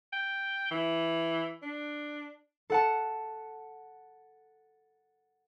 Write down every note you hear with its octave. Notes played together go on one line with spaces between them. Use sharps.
G5
E3
D4
A4 F#5 A5